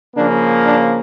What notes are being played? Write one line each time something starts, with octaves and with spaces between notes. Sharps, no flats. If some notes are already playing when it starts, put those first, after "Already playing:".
C#3 F3 A#3 D4
D4